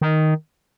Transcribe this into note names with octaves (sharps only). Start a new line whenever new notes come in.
D#3